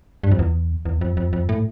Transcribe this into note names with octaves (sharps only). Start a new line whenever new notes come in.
G2
F2
E2
E2
F2
F2
F2
A2